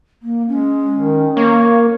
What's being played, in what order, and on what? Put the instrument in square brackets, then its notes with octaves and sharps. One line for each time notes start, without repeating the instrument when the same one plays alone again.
[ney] A#3
[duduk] G#3 [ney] C#4
[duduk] D#3
[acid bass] A#3 [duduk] C#5